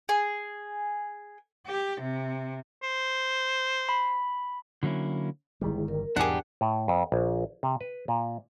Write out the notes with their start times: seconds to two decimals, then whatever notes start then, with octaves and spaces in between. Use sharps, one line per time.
0.09 G#4
1.67 G4
2.00 C3
2.83 C5
3.89 B5
4.83 D3 F#3 A#3 C#4 E4
5.61 G1 D#3 G3 G#3 E4 G#4
5.88 A#4
6.16 E2 G#2 B2 D4 G4 G#4 F#5
6.61 A2
6.88 F2
7.12 A#1
7.63 C3
7.81 B4
8.08 A#2